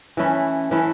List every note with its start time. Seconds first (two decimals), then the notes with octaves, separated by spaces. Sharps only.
0.17 E3 A3 C#4 E4
0.71 E3 A3 C#4 E4